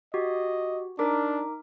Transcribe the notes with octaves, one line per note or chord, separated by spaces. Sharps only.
F#4 G4 D#5
D4 D#4 A#4 D6